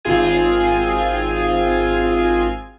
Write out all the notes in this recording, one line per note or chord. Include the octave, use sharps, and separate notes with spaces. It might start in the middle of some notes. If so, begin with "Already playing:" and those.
G#1 C4 F4 G#4 G#5